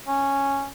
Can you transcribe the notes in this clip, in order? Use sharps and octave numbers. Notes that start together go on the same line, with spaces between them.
C#4